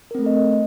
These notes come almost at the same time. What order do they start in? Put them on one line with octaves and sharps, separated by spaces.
A#4 C4 A3 A4 D#5